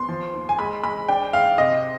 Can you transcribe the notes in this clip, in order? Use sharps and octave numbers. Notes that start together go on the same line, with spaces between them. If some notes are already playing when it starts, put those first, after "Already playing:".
Already playing: B3 C6
F3
D#2
G#5
G#3 B5
G#3 B5
D4 G5
G#2 F5
C3 D#5